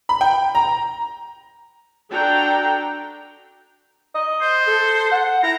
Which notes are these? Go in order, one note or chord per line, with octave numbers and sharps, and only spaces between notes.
B5
G5
A#5
D4 F#4 A4 G5 A#5
D#5
C5
A4
F#5
E4 A#5